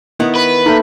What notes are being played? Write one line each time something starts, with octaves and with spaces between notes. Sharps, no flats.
D#3 B3 E4 C#7
B4
A3 A#3 D#4 A4 G6